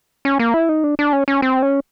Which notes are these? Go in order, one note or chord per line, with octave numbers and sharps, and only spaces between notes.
C#4
A#3
E4
D#4
D4
D4
C#4
C#4
C4
C#4